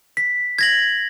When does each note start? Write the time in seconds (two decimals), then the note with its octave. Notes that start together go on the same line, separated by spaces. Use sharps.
0.17 B6
0.59 G#6 A#6 F#7